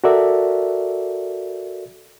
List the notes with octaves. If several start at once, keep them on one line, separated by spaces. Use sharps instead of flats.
F#4 A4 A#4 D5 E5